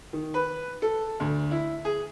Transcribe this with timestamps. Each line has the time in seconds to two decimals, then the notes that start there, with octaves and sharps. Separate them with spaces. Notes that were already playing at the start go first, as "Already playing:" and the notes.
0.13 D#3
0.34 B4
0.82 A4
1.20 D2
1.51 E4
1.85 G#4